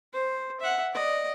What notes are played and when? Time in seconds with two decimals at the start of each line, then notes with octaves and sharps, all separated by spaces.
0.13 C5
0.60 E5 F#5
0.93 D5 D#5